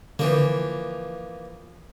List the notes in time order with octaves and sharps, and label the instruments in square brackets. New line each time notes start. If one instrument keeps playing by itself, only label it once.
[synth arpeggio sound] D3 [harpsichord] E3 F3 A#3